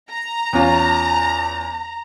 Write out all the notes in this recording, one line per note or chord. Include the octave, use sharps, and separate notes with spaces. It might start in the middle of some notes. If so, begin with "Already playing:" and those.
A#5
E2 C#4 F4